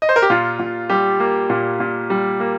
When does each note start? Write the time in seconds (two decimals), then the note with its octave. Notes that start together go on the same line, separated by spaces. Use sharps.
0.02 D#5
0.09 C5
0.16 A#4
0.22 G4
0.30 A#2 F4
0.59 A#2
0.90 G3 G4
1.20 A#3
1.50 A#2
1.80 A#2
2.10 G3
2.40 A#3